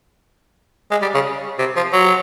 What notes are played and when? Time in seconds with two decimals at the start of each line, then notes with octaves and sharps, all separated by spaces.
0.91 G#3
1.02 G3
1.14 C#3
1.59 C3
1.76 F3
1.93 F#3